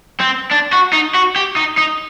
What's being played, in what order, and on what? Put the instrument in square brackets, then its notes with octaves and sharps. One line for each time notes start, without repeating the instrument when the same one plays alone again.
[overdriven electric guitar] C4
D4
F#4
D#4
F#4
G4
D#4
D#4